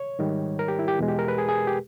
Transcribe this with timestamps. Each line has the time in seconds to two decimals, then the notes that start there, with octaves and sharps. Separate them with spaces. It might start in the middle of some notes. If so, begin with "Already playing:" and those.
Already playing: C#5
0.19 G#2 D#3 G3
0.59 A#4
0.68 G4
0.79 E4
0.88 G4
0.99 E2 B2 G#3
1.08 G4
1.19 A#4
1.28 B4
1.38 G#4
1.49 G#4
1.67 G4